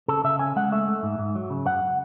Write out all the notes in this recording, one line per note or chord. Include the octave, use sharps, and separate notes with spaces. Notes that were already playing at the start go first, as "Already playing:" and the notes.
C#3 A4
C#3 E5
C#4 G#5
G#3 F#5
A3 E5
A3
G#2
G#2
F#3
C#3
F#2 F#5